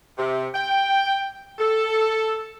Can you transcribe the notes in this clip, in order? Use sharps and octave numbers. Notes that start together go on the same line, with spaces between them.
C3
G5
A4